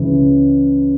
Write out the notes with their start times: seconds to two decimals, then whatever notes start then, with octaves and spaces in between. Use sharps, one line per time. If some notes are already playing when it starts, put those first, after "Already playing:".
Already playing: C#2 C#3 E3